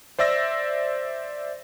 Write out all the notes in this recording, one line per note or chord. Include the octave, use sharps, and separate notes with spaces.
C5 D5 E5 E6 A#6